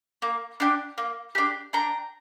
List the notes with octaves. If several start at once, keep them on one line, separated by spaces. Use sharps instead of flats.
A#3
D4 G4
A#3
D4 G4
D4 G5 A#5